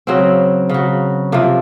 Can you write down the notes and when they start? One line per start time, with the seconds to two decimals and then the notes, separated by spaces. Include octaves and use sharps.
0.07 C#3 F#3 C4
0.69 C#3 F#3
1.32 C3 F3 A#3